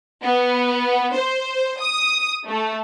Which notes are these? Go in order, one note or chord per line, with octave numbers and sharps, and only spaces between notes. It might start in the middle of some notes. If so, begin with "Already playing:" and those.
B3
C5
D#6
A3